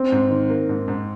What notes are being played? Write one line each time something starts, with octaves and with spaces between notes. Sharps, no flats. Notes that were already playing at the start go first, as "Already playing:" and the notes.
Already playing: C4
G#2
D#3
A#3
G#2
G#2